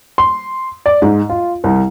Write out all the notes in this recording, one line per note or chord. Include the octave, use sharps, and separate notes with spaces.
C6
D5
G#2
F4
C2